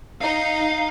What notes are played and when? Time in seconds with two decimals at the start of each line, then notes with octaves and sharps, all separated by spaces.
0.21 D#4 F5